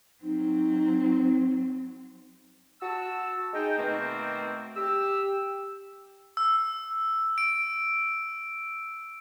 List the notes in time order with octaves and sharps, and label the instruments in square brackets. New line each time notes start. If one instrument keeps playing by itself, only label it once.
[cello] F#3 C4 [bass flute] D#4
[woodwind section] F#4 A5 E6
G#3 D#4 G5
B2 D#3 A3 A#3 C4
G4 E6
[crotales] E6
D7